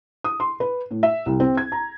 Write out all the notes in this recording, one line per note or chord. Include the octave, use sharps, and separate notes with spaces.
D#6
C6
B4
A2
E5
C2
C4
G#6
A#5